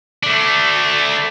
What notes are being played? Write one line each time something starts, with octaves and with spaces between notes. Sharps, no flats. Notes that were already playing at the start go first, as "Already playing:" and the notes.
A3 D4